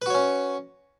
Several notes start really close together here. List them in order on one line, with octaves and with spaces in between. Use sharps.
B4 F#4 C#5 C#4